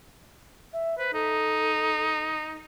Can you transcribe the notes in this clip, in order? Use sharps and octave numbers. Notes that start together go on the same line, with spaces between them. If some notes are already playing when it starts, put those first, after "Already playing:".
E5
B4 C5
D#4 A4